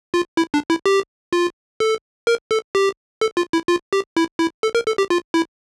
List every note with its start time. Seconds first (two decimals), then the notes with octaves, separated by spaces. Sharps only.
0.14 F4
0.37 E4
0.54 D4
0.70 E4
0.86 G4
1.33 F4
1.80 A4
2.27 A#4
2.51 A4
2.75 G4
3.21 A4
3.37 F4
3.53 E4
3.68 F4
3.93 G4
4.17 E4
4.39 E4
4.63 A4
4.75 A#4
4.87 A4
4.98 G4
5.10 F4
5.34 E4